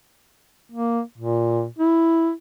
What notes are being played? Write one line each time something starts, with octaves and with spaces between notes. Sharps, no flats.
A#3
A#2
E4